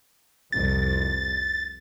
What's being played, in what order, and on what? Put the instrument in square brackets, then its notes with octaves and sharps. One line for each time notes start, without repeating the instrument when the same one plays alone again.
[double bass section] C2 F2 [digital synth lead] A6